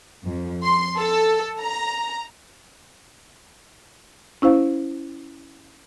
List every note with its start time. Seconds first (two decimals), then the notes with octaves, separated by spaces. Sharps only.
0.25 F2
0.62 C6
0.98 A4
1.59 A#5
4.42 C#4 E4 C5 F5